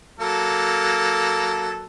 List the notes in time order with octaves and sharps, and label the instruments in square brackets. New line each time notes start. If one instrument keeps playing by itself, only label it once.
[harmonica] F#3 A#3 A4